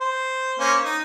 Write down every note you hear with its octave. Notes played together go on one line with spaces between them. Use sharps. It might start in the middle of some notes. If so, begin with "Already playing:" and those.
C5
A#3 C#4 C5
D#4